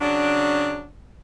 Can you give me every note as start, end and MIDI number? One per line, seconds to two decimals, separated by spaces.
0.01 0.84 49
0.01 0.84 54
0.01 0.84 62